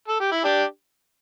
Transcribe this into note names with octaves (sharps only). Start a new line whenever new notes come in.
A4
G4
E4
D4 G4